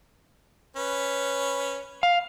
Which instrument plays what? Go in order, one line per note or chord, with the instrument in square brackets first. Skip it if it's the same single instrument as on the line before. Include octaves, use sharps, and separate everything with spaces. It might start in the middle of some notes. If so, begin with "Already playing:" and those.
[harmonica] C#4 B4
[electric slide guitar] F5